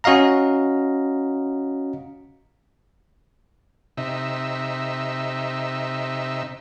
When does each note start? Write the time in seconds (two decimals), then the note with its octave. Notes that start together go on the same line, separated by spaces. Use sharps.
0.04 C#4 F#4 D#5 F5 A#5
3.97 C3 D#4 E5